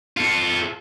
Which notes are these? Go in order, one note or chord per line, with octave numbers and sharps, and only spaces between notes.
F4 A4